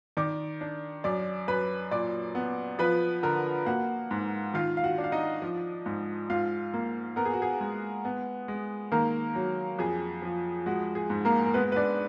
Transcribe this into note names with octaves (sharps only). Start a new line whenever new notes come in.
D#3 D5 D6
D4
F#2 D5 D6
F#2 B4 B5
A#2 D5 D6
B3
F3 B4 B5
D3 A#4 A#5
A#3 F#4 F#5
G#2
D#3 F4 F5
F5
F#4 F#5
D4
F5
D#4 D#5
F3
G#2
G#2 F4 F5
A#3
B3 A#4
G#4
F#4
G#4
G#3
B3
G#3
D#3 A#3 A#4
F#3
F2 G#4
F3
G#3 F#4
G#4
G#2
A#3 A#4
A#4
G#3 B3 B4
B4
D4 D5